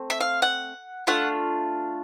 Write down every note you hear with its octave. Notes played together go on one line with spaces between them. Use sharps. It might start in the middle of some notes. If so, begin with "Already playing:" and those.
Already playing: A3 C4
E5
F5
F#5
A3 D4 F4 F#5